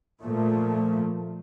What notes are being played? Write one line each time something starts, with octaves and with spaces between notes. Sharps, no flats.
A#2 F3 A3